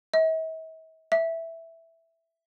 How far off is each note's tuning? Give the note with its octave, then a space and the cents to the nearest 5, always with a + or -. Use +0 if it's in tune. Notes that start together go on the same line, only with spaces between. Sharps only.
E5 -45
E5 +0